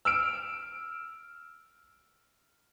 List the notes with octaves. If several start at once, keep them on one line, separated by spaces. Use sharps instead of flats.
E6 F6 D7